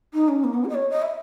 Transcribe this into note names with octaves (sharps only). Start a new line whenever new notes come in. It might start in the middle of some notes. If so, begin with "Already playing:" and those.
D#4
C#4
A#3
B3
G#4
D#5
C#5
D#5
E5